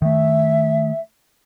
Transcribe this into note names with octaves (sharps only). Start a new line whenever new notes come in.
D#3 A3 E5